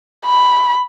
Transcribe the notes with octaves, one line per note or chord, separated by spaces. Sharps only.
B5